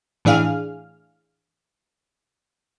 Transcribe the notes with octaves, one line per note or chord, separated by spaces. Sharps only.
A2 E3 D4 G#4 F5 F6